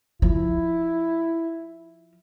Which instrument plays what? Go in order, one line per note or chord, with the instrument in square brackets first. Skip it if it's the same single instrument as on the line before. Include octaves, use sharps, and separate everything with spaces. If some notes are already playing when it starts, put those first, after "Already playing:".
[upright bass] F3 [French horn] E4